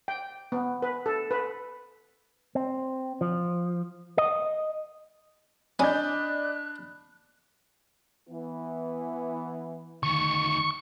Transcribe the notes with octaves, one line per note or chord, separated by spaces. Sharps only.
G5
B3
B4
A4
B4
C4
F3
D#5
C#4 D4 D5 D#5 B5 D#6 F#6 G6
E3 B3
D2 D#3 C#6